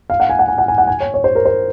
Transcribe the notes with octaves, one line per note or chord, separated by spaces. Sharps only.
F5
F#5
G#5
F#5
G#5
F#5
G#5
F#5
G#5
C#5
C#5
C5
A#4
C5